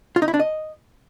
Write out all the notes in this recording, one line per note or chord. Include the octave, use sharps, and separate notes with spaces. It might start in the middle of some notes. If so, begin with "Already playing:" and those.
F4
D#4
E4
D4
D#5